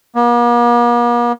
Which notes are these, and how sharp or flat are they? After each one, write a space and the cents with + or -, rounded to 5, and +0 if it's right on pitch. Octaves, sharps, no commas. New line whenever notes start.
A#3 +45